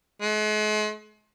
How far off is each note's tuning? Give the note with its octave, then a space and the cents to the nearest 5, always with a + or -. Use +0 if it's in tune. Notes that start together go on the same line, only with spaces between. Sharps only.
G#3 +45